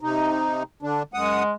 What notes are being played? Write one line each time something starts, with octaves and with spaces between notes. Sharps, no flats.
C3 D#4
D3 D4
F#2 G#3 F#5 D#6